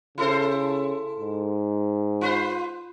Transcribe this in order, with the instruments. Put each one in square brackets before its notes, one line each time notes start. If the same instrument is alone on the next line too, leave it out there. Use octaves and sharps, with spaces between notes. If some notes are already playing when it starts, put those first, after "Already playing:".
[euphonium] C#3 [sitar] E4 A4 C5
[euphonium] G#2
[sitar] F4 B4 C5